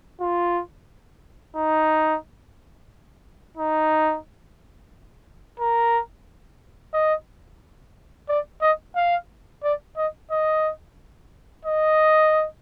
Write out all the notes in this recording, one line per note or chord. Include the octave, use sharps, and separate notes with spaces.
F4
D#4
D#4
A#4
D#5
D5
D#5
F5
D5
D#5
D#5
D#5